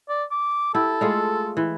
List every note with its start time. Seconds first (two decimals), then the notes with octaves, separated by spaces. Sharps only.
0.09 D5
0.31 D6
0.74 E4 G4 A4
1.01 G#3 A3 F4
1.57 E3